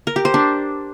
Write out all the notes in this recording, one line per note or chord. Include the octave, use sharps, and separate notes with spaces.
A#4
G4
C5
D4